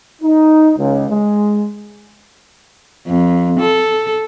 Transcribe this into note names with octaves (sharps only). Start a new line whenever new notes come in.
D#4
C#2
G#3
F2
A4